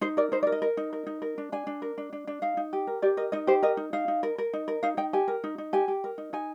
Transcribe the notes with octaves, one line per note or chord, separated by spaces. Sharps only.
D#4 C5
A#4 D5
D#4 C5
D5
A#4
D#5
A#4
D#4
A#4
D#4
A#4
D4
D4 G#5
D4
A#4
D4
D4
D4
D#4 F5
D#4
G4
A#4
G4 D5
A#4 D#5
D#4 D#5
G4 C5
A#4 D#5
D#4
D#4 F5
D#4
A#4
A#4
D#4
A#4
D#4 F5
D#4 G5
G4 G#5
A#4
D#4
D#4
G4 G#5
G4
A#4
D#4
D#4 G#5